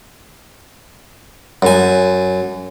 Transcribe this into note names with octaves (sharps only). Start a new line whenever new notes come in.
F#2 G#5